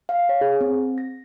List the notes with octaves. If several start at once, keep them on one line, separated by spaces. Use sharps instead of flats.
F5
C#5
G#4
C4
A#6